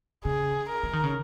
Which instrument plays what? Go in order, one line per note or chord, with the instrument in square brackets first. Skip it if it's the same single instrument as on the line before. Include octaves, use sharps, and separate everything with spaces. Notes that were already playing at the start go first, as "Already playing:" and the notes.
[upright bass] C#3 [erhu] G#4
[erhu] A#4
[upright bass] F3
D#3
C#3